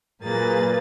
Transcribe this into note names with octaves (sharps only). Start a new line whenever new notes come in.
A#2 F#3 A#3 G#4 B4 A6